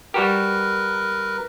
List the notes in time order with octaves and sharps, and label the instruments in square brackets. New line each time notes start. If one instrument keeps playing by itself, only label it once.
[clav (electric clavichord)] G3 F#4 G4 [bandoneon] A#4 B4